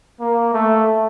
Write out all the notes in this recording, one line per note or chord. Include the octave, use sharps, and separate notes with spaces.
A#3
A3